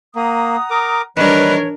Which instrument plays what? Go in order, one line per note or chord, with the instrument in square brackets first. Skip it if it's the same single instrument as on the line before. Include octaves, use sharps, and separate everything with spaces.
[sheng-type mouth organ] A#3 [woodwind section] F#5 A#5 D#6
[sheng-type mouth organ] A#4 D6
[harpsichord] D#3 G3 [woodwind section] E3 C#5 [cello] D4 A#4 [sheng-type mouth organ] B4